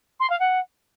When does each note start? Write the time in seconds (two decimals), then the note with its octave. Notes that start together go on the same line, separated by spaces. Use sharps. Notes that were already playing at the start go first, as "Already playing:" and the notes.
0.20 C6
0.29 F5
0.39 F#5